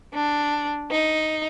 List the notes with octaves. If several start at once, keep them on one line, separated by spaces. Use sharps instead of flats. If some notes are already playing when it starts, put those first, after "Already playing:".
D4
D#4